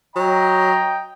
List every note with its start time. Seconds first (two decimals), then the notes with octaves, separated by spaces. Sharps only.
0.16 F#3 D#5 G5 A#5